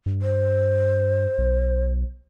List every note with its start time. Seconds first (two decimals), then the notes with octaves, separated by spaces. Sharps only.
0.06 G2
0.22 C5
1.38 B1